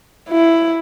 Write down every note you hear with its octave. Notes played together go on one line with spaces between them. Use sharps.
E4